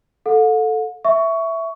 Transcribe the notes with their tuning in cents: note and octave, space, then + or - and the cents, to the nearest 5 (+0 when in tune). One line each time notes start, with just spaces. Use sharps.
A4 +0 F#5 -45
E5 +0 C#6 +15